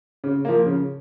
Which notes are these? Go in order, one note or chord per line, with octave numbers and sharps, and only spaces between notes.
C#3
F3 A#3
C#3